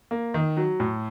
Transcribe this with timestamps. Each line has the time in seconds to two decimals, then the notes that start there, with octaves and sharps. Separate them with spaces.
0.11 A#3
0.34 D#3
0.57 F#3
0.80 A2